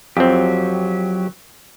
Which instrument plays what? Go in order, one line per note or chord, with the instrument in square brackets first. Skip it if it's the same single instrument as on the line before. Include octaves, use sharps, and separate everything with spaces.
[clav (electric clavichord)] F2 C4 [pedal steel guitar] F#3 G4